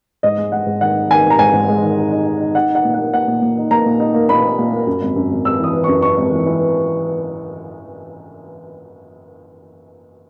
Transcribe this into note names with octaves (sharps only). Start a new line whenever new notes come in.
G#2 D#5
G#3
G#3 F#5
G#2
D#3 F#5
D#4
D#3 G#5
D#3
A#5
G#2 G#5
G#2
G#3
D#3
D#4
D#4
D#4
D#4
D#4 F#5
D#4
F#5
A#2
A#3 F#5
A#3 F#5
A#2
A#2
D#4
A#3 A#5
A#2
D#4
A#3
A#2 B5
A#3
A#2
A#3
F#2
G#1
F#2
G#1
G#1 E6
E3 D#6
E3
F#2 C#6
F#2 C#6
G#1
E3
E3